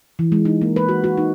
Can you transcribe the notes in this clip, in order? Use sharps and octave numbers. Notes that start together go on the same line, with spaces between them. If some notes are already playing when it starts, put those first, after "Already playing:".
E3
G#3
D#4
A#3
B4
F#4
F#4
D#4